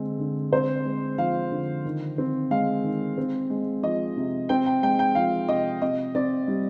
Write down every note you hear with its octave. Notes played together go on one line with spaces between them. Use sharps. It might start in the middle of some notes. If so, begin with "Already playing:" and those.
Already playing: D3 G#3 C4
D3
C4 C5
G#3
F3 F5
D3
D#3
C4
G#3 F5
D#3
C4
G#3
F3 D#5
C3
C4 G5
G5
G#3 G5
G5
F3 F5
C3 D#5
C3 D#5
C4 D5
G3